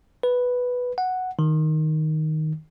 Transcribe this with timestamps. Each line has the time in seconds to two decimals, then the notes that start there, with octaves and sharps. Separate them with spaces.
0.23 B4
0.98 F#5
1.39 D#3